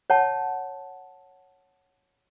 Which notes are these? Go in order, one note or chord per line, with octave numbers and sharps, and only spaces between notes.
C#5 F#5 A5